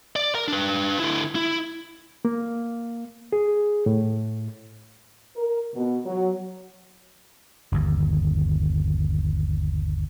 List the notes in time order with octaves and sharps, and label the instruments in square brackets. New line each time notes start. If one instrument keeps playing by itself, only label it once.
[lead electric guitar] D5
A#4 A#5
D4 B4
D3 E4
E4
[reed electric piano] A#3
G#4
A2
[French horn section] A#4
B2
F#3
[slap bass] G1 D#2